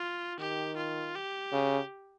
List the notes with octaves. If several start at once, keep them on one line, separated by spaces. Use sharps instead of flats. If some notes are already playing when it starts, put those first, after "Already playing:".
Already playing: F4
D#3 G4
F4
G4
C#3